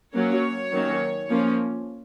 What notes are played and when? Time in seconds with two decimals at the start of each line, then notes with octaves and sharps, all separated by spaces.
0.14 F#3 A#3 C#4 C#5
0.73 D#3 F#3 A#3 C#4
1.29 F3 A#3 C#4